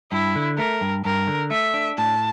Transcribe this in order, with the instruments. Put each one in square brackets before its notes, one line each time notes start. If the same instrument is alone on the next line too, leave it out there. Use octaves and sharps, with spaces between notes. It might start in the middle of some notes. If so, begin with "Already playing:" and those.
[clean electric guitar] G2 [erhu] E4
[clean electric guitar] D3
[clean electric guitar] A3 [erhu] A#4
[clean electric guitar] G2
[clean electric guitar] G2 [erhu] A#4
[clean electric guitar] D3
[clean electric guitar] A3 [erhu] E5
[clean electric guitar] D4
[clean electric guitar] A2 [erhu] A5